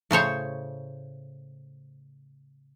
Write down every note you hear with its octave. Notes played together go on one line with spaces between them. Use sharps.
A2 C#3 C5 C#5